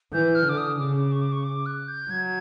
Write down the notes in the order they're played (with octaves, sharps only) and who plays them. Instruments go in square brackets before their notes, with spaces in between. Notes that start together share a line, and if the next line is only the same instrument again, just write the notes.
[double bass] E3 [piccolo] G6
[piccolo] F6
[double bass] D3 [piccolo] D6
[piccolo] D#6
[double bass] C#3 [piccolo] D6
[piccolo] C#6
D6
C#6
D6
F#6
G6
[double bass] F#3 [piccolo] G#6